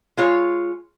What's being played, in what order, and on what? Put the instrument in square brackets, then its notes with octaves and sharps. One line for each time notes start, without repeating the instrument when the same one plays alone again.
[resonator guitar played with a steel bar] G#3 F4 C#5